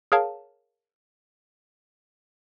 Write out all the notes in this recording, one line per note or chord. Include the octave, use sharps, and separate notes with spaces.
G#4 A#4 C#5 F5 A5